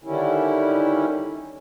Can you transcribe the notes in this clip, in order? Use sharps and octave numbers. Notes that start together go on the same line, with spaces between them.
D3 D#3 G3 C#4 E4